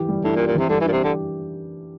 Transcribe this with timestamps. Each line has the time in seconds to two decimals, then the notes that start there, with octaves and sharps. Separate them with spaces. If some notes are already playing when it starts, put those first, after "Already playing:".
Already playing: E3 G4
0.08 G3
0.24 A2 D4
0.36 A#2
0.39 G4
0.47 A#2
0.55 C3 E3
0.69 D3 G3
0.81 E3
0.85 A#2 D4
0.92 C3
1.00 D3 G4